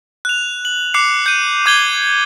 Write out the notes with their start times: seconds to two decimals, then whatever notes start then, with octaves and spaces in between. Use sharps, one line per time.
0.25 F#6 F7
0.65 F#7
0.94 D6 F#6 C7 C#7
1.26 G6 D#7
1.66 D6 G6 G#6 F#7 G7